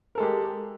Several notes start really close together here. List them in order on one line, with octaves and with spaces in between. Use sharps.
A#4 A4 G#3 G4